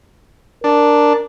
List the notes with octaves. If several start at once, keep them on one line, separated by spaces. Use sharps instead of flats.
D4 A#4